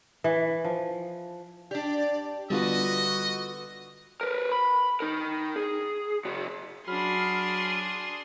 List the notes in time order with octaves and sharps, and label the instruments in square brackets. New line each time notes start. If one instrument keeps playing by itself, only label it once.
[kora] E3
F3
[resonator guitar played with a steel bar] D4 G4 [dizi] D5
[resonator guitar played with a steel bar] D3 B4 [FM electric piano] G3 B3 F4 [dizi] F#4 [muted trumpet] D#5
[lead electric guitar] A#4 B4
B5
D#4 A#4
G#4
C#3 F#4
[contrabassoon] F#3 [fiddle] D4 G#4 [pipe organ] B5 F6 [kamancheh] C6